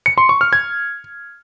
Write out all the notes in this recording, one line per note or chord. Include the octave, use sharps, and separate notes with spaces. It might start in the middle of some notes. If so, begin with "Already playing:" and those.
C#7
C6
C#6
F6
G#6